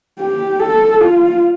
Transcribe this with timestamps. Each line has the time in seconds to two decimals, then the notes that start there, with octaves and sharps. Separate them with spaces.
0.20 G4
0.59 A4
1.00 F4